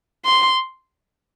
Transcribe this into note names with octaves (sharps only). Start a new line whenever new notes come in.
C6